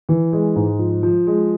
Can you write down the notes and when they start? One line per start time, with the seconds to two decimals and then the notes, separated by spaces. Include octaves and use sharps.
0.09 E3
0.33 G#3
0.56 G#2
0.79 F3
1.03 F3
1.27 G#3